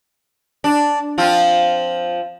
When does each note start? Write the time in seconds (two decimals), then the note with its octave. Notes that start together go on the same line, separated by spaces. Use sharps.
0.64 D4
1.18 F3 C4 F4